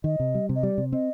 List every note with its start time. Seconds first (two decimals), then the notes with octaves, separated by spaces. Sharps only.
0.04 D#3 D#5
0.20 C3
0.35 G3
0.49 C3
0.55 D#5
0.63 G3 D5
0.78 C3
0.92 C4 D#5